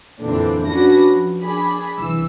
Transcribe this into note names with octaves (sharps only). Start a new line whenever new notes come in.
F2 A#2 D3 E3 C4 D4
C#4 D4 F#4 B4 A#6
F3
D4 G#4 B5
C2 E3 E6